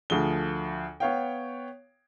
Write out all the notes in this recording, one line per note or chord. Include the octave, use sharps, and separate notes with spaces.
D2 F3 G#4 G7
B3 C#5 F5 G5